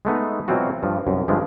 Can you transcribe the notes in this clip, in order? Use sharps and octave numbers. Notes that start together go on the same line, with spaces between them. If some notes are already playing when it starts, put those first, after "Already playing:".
G#3 A3 B3 D#4
B2 E3 F#3 C4 F4 F#4
G2 F3
C2 F#2
G2 D3 F3 G#3 A3